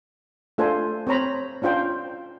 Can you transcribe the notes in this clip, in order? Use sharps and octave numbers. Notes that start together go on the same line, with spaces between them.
A3 D4 F4 A4 C5 G#5
C4 C5 C#5 A#5 B5
C#4 D4 F4 C5 G5